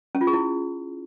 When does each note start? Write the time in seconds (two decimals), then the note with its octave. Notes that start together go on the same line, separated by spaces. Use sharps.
0.15 C#4
0.21 F4
0.27 G#4
0.33 E4